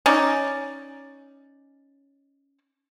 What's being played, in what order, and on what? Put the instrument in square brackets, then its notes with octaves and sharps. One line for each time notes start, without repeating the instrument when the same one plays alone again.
[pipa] C#4 D#4 D5